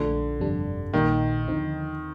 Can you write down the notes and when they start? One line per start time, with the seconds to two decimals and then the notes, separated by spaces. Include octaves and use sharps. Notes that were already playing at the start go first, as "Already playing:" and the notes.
Already playing: A#1 A#2 D3 F3 A3
0.39 G1 F2 C3 G3 D4
0.93 A#1 A#2 D#3 G3 A#3 D#4
1.47 D#2 D3 F3 C4 D#4